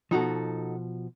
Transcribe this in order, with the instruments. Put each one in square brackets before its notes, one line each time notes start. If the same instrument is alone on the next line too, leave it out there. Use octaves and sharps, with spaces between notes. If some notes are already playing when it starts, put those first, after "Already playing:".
[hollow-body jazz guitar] B2 F3 [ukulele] D#4 F#4 A4